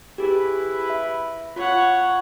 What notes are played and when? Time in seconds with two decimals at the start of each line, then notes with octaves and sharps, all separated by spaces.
0.18 E4 G4 G#4 B4
0.90 E5
1.56 F4 C#5 F#5